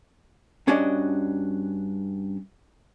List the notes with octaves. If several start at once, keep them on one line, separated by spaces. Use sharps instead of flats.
G2 C#4 D4 F#4 D5 D#5